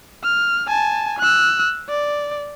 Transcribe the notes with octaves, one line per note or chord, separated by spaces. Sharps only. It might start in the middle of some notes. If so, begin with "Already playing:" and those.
F6
G#5 A5
E6 F#6
D5